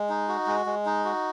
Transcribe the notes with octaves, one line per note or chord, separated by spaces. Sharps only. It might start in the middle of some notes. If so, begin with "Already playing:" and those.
Already playing: G#3
D#4
F#4
G#3
G#3
D#4
F#4